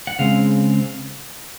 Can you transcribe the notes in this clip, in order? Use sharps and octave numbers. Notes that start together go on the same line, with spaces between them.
F#5
C#3 G#3 C4 F5